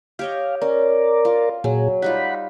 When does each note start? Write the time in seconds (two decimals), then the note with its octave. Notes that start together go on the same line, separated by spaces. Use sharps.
0.19 G4 C#5 D#5 F5
0.61 C#4 A#4 D5
1.25 F4
1.64 A#2 F#3 G#4
2.02 G3 D#4 F4 F#5 B5